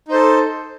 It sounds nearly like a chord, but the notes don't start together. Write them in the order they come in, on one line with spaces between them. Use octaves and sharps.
D#4 C5 A4